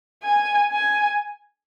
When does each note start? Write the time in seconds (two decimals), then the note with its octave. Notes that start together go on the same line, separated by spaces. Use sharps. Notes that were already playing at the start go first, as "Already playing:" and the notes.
0.24 G#5
0.72 G#5